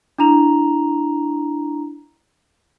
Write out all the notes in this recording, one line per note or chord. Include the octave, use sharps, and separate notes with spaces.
D4 E4 A#5 F7